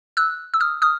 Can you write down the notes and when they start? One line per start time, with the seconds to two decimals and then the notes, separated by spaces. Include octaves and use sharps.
0.17 E6 F#6
0.54 E6
0.60 D#6 F6
0.82 D#6 F6